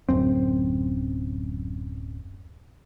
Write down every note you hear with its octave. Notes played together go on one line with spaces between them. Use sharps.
D1 F#2 C4